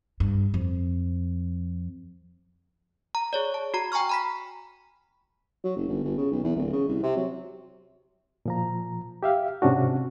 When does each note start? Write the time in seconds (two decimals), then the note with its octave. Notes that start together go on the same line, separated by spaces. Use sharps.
0.20 G2
0.54 F2
3.15 A#5
3.33 G#4 C#5 D5
3.54 A5
3.74 F#4 A#5
3.92 G5 G#5 A#5 C#6 F6
4.09 A#5 B5 B6
5.64 F#3
5.77 F#1
5.88 G1
6.04 G1
6.17 C#3
6.32 B1
6.44 E2
6.56 D1
6.73 C#3
6.88 C2
7.03 C3
7.17 F#3
8.46 A#2 F3 A#5
9.23 G4 E5 F5
9.62 G#2 C3 C#4 D4 F#4